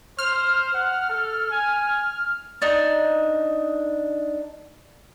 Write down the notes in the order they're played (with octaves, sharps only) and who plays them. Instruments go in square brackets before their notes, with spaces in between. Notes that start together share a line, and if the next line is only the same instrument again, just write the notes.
[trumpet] C5 [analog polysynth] F6
[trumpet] F#5
A4
G#5
[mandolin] D4 D#4